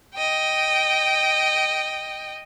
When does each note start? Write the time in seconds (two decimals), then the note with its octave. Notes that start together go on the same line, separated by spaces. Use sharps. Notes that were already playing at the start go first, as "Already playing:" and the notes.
0.15 D#5 G5